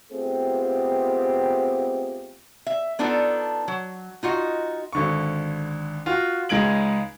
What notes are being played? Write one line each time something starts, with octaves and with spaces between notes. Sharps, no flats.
A3 B3 C4 F4 G4 G#4
E5
B3 D4 D#4 F4 A4
F#3
D#4 F4 F#4 D#5
G#1 D3 C#6
F4 F#4
C#2 G#3 D#4 G#6 D7 F#7